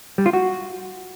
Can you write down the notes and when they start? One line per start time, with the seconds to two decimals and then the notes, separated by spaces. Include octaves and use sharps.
0.18 G3
0.26 F4
0.33 F#4